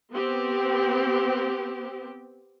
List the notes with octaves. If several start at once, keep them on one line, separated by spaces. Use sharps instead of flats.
B3 C4 G4